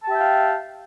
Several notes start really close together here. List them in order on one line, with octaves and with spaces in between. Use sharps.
A5 G4 E5 G5 F5